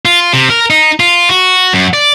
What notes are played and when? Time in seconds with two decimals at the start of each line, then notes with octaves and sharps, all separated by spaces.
0.05 F4
0.33 C3
0.50 A#4
0.70 D#4
1.00 F4
1.29 F#4
1.73 F#2
1.94 D5